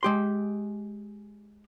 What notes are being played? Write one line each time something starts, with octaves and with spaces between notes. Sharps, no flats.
G#3 G4 C6